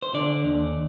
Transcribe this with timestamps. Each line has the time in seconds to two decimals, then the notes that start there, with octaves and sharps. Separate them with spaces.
0.02 C5
0.14 D3 D5
0.44 D#2